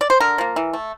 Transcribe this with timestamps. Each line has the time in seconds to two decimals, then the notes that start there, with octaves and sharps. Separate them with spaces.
0.01 D5
0.10 C5
0.20 D3 A#4
0.38 F3 A#3
0.56 E3
0.73 A3